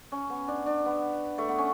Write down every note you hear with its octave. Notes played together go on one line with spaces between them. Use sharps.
C#4
B3
D4
D4
B3
A3
B3
C#4